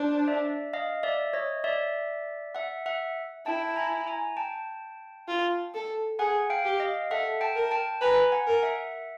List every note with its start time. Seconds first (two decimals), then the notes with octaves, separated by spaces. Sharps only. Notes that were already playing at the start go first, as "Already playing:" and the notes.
Already playing: D4 C5
0.28 D5 E5
0.73 D#5 F5
1.03 D5 E5
1.33 C#5 D#5
1.64 D5 E5
2.55 E5 F#5
2.86 E5 F#5
3.46 E4 G5 A5
3.76 G#5 A#5
4.07 G#5 A#5
4.37 G5 A5
5.28 F4
5.75 A4
6.19 G#4 F#5 G#5
6.50 F5 G5
6.65 G4
6.80 D#5 F5
7.11 A4 E5 F#5
7.41 G5 A5
7.56 A#4
7.71 G5 A5
8.01 B4 G#5 A#5
8.32 F#5 G#5
8.47 A#4
8.62 E5 F#5